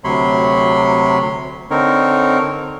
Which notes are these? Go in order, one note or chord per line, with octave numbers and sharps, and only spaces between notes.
D2 C3 F#3 C#5 B5 C6
D3 C4 D#4 A#4 C#5